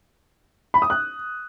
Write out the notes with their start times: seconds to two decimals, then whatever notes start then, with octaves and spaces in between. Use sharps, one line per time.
0.74 B5
0.82 D#6
0.90 F#6